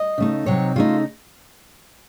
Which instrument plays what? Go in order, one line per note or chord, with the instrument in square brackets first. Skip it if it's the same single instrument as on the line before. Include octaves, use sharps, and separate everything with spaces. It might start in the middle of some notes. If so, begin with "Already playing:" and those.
Already playing: [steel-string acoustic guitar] D#5
C#3 A3 D#4
C3 F#3 C4 D#4 C#5
C#3 A3 D#4 F4